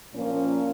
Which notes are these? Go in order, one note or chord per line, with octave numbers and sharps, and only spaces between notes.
A#2 F3 A#3 C#4